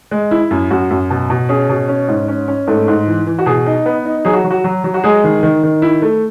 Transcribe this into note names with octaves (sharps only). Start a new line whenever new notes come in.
G#3
E4
F#2
F#2 F#4
F#2
B2
B2
C#4 G#4
B2
C#4
G#2
C#4
C#4
G#2 A3 A4
G#2
E3
E3
F#4
B2 G#4
D#4
B3
D#4
F#3 G#4
F#4
F#3
F#4
F#3
F#3
F#4
G#3 G#4
D#3
D#3
D#3
E4
A3